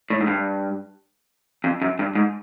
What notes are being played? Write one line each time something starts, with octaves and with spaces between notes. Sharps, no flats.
A2
G#2
G2
F2
F#2
G2
G#2